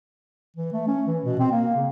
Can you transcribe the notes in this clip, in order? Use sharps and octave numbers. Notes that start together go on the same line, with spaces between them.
E3
A3
C#4
E3
B2
C4
A#3
C#3